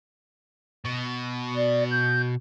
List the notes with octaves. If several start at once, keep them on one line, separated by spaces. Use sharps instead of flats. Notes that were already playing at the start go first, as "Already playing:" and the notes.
B2
D5
G6